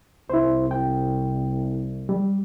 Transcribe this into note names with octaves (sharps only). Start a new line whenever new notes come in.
C2 E4 C5
G5
G3